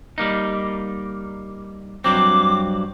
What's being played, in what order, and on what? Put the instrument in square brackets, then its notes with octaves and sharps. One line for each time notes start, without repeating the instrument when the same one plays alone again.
[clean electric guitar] G3 A#3 D#4
[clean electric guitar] G2 F#3 C4 [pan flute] D6